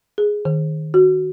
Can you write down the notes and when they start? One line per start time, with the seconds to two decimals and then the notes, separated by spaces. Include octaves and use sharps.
0.18 G#4
0.45 D#3
0.94 F#4